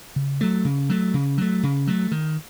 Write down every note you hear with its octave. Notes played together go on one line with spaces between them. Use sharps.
C#3
F#3 A3
C#3
F#3 A3
C#3
F#3 A3
C#3
F#3 A3
D#3